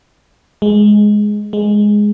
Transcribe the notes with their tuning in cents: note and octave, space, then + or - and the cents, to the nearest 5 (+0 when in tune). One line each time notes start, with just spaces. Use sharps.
G#3 +5
G#3 +0